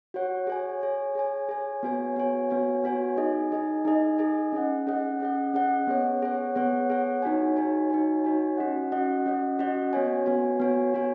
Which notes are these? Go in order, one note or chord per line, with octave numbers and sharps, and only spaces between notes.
F#4 C#5 F#5
G#4 C#5 G#5
G#4 C#5 G#5
G#4 C#5 G#5
G#4 C#5 G#5
B3 F#4 C#5 G#5
B3 F#4 C#5 G#5
B3 F#4 C#5 G#5
B3 F#4 C#5 G#5
D#4 G#4 D#5 G#5
D#4 G#4 D#5 G#5
D#4 G#4 D#5 G#5
D#4 G#4 D#5 G#5
C#4 G#4 D#5 F#5
C#4 G#4 D#5 F#5
C#4 G#4 D#5 F#5
C#4 G#4 D#5 F#5
B3 G#4 C#5 F#5
B3 G#4 C#5 F#5
B3 G#4 C#5 F#5
B3 G#4 C#5 F#5
D#4 F#4 C#5 G#5
D#4 F#4 C#5 G#5
D#4 F#4 C#5 G#5
D#4 F#4 C#5 G#5
C#4 F#4 D#5 F#5
C#4 F#4 D#5 F#5
C#4 F#4 D#5 F#5
C#4 F#4 D#5 F#5
B3 F#4 C#5 G#5
B3 F#4 C#5 G#5
B3 F#4 C#5 G#5
B3 F#4 C#5 G#5